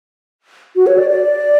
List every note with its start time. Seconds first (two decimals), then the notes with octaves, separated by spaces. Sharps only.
0.76 F#4
0.87 C#5
0.98 D5
1.09 D5